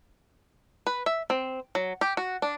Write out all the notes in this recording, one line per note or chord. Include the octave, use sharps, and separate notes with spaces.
B4
E5
C4
F#3
G4
F#4
D4